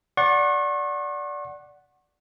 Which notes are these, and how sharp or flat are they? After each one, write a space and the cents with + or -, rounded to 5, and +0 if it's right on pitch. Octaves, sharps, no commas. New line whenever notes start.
D5 -10 F#5 +0 C#6 -40